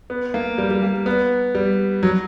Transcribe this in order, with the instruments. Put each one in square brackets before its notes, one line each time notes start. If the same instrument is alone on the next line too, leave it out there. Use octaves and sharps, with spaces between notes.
[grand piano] B3
A#3
G3
G3
A#3
B3
G3
F#3